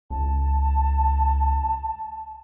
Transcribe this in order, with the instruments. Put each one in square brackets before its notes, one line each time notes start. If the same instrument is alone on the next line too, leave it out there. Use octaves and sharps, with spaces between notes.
[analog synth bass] C#2 [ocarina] A5